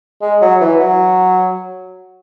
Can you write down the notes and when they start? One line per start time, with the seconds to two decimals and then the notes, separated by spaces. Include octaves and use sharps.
0.22 G#3
0.42 F#3
0.61 E3
0.80 F#3